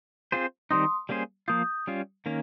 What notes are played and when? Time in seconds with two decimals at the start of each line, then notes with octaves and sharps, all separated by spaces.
0.32 C4 F4 G#4 C5
0.71 D#3 G3 C4 D#4 C6 D#6
1.09 G3 A#3 C#4 G#4 C5
1.48 F3 A#3 F4 D#6 G6
1.87 G3 C#4 F4
2.26 D#3 A#3 C#4